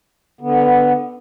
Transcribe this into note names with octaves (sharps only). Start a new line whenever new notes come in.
D3 B3